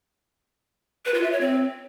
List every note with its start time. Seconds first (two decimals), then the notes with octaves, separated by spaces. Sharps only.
1.06 B4
1.14 F4
1.23 E5
1.32 C#5
1.41 C4